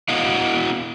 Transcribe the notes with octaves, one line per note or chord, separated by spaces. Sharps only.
B3 E4 F#4 D#5 F5 F#5